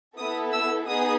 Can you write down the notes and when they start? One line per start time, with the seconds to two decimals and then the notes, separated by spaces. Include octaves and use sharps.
0.17 B3 E4 A4 D#6
0.52 E6
0.87 B3 D#4 G#4 D#6